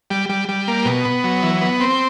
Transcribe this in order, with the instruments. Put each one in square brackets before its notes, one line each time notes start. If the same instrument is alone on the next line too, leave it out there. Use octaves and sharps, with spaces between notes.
[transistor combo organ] G3
G3
G3
A#3
B2
B3
F#3
E3
B3
C4